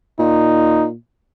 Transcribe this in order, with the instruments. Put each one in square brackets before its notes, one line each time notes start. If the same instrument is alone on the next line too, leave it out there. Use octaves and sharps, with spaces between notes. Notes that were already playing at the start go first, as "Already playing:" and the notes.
[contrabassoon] A#2 [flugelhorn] D#4